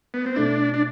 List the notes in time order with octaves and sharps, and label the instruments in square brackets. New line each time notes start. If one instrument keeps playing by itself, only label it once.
[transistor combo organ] B3
C4
[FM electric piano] B2 A3 E4 [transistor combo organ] D4
[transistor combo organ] D4